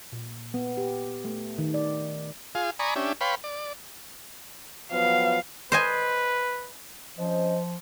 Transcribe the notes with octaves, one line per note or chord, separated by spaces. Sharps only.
A#2
B3
G4
A3
D#3
D5
F4 G#4 F5
D5 G#5 A#5 B5 C#6 D#6
C#4 D4 G4 E5
B4 C#5 F5 G5 B5 C6
D5
F3 F#3 B3 F5
B4 C5 D#5 G#5
F2 F3 C#4 C5 D#5